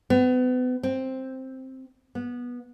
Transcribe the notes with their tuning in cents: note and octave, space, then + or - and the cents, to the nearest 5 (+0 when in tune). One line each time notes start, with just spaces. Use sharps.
B3 +35
C4 +5
B3 -15